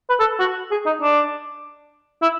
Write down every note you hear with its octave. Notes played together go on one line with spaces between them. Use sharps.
B4
A4
F#4
G#4
D#4
D4
E4